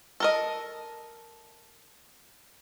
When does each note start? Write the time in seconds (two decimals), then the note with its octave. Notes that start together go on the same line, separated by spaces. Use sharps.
0.20 A4 A#4 D#5